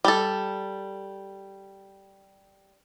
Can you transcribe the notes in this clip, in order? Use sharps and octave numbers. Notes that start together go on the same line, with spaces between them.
G3 A4